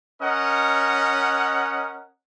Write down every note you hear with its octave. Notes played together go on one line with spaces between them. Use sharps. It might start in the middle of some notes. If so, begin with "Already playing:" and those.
C#4 A#4 D#5 F#5